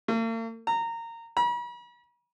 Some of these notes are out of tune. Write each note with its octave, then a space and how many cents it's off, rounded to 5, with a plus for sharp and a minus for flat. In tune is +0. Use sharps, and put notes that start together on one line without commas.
A#3 -45
A#5 -20
B5 -45